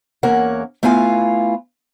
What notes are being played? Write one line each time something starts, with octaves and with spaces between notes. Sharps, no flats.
E2 A#3 C#4 A#4 C#5 F#5
A3 B3 E4 F4 F5 G#5